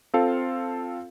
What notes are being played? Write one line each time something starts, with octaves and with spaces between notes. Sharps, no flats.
C4 F4 A4 F5